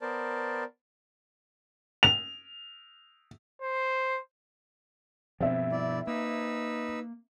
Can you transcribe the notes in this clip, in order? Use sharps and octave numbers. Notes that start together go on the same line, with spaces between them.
B3 A#4 C5 D5 A5
F7
C5
G2 B2 F3 C4 E5
E4 D5
A#3 D#4 B4 E6